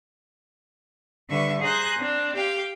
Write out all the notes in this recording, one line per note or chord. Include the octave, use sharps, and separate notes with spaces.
D3 G3 B4 E5 C#6
G#4 C5 G#5 A#5 F#6 G6
C4 D4
G4 F5 G5